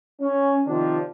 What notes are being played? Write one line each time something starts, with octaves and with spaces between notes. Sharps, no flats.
C#4
C3 D#3 F3 D4